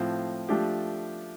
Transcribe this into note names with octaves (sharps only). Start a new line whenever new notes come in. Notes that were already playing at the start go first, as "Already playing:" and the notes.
Already playing: A2 F3 C4 F4
F3 A3 D4 G4